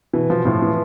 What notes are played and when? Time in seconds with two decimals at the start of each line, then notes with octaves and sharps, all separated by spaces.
0.13 B2 E3
0.30 B2 F3
0.45 A2 F3
0.62 E3